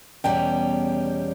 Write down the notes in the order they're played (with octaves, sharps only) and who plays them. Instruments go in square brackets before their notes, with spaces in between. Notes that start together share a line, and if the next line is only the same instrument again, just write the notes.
[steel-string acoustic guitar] E2 B2 G3 C#4 [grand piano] G5